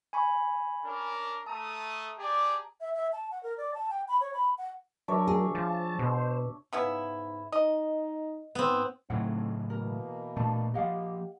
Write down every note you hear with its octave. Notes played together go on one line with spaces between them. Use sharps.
G#5 B5 C#6
C#4 D4 A#4
A3 A5 A#5 D#6
G4 G#4 D5
E5
E5
A5
F#5
A#4
D5
A5
G5
B5
C#5
B5
F#5
F#3 D4 A#4 C#5 E5
G#4
F3 A5
B2 C5
G#2 C#3 B3 E4
D#4 D#5
G#2 B3 C4
A2 C#3 F#3 A3 C4 D#4 E4 F#5
B2 E3 A#3 A#4
A#2 A3 D4 A5
F3 A#3 G4 D#5 F5 F#5